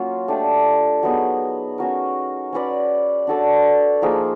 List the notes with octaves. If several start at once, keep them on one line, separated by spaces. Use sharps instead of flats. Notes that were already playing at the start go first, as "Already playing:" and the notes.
Already playing: F#3 A#3 C#4 F4
A3 D4 G4
F#3 B3 D#4 G#4
C#4 F#4 A#4
C#4 F#4 B4 D5
D4 F#4 A4 D5
F3 A#3 D#4 G#4